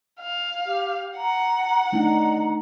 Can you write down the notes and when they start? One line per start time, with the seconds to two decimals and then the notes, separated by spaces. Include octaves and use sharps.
0.20 F5
0.65 G4
1.17 F#5 A#5
1.93 A3 D4 D#4 A#5